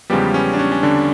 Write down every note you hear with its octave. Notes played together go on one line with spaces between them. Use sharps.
E2 C#3 F3 G3 G#3 B3 G4
C#4
D4
C#4
C#4
D3 D4